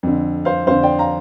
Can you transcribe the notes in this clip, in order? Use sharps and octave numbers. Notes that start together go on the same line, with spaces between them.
F2 D3
C5 F5
F2 D3 C5 F5
D5 G5
F5 A#5